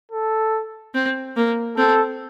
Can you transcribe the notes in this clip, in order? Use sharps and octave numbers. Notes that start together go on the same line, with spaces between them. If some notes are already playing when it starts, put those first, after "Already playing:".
A4
C4
A#3
C4 A4